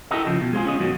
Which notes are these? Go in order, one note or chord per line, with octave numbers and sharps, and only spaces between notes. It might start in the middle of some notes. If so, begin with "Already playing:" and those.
E4 G4 A4 A#4 D#5
C#3 F3
B2
G#3 C4 F4 G#4
C#4 G#4 D#5
F#2 B2 D#3 F#3